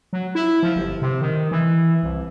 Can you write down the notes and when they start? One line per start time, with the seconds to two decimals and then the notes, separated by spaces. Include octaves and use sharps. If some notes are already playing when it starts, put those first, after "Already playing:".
0.13 F#3
0.35 E4
0.63 F3
0.76 G1
1.02 C3
1.22 D#3
1.51 E3
2.03 C2